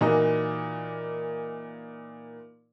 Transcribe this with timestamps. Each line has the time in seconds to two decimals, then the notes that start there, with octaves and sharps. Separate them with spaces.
0.01 A#2 E3 A#3 D#4 F#4